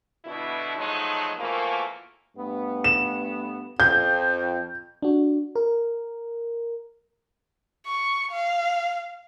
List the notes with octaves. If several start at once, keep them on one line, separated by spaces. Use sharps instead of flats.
B2 D3 E4
F3 F#3 G#3 A3 D#4
B2 E3 F3 A3 A#3
G2 A3 B3
E7
F2 G6
D4 F#4
A#4
C#6
F5